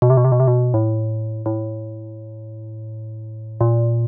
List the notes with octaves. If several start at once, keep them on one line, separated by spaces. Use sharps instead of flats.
B2
C3
B2
C3
B2
C3
B2
A2
A2
A#2